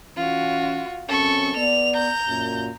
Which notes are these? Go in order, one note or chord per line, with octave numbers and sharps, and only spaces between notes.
E3 C#4 F4 F#4
F#2 C4 C#4 A4 C#6
B3 D5 F7
A#5 G6
F#2 A#2